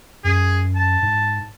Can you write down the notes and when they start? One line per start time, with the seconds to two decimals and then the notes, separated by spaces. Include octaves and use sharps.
0.24 F#2 G#4
0.76 A5
1.02 G#2